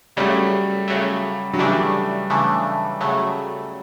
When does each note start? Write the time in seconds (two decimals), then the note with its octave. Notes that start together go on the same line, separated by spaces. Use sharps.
0.17 C#3 F#3 G3 A3
0.88 C#3 F#3 A3
1.53 F#3
1.59 C#3 E3 G3 A3 D4
2.30 C#3 E3 A3 D4
3.00 C#3 F#3 A3